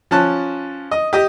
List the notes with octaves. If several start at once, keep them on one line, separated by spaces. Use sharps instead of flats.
F3 C#4 A5 F#6
D#5
G4 D#5